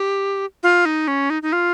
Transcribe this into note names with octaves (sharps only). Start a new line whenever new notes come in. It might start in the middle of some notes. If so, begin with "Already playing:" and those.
Already playing: G4
F4
D#4
C#4
D#4
D#4
F4